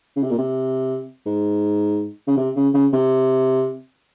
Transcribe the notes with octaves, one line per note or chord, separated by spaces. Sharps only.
C#3
C3
A#2
C3
G#2
C#3
C3
C#3
C#3
C3